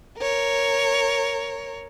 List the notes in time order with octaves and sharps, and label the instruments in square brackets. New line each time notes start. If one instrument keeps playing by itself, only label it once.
[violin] A#4 C#5